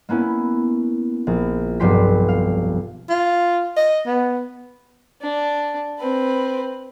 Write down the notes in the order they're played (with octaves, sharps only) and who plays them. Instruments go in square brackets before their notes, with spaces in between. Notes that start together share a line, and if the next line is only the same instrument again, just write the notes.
[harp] A#3 B3 C#4 E4
A#1
F1 B1 G2 G4 C6 B6
F5
[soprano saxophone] F4
D#5
B3
[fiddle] D4
C4 B4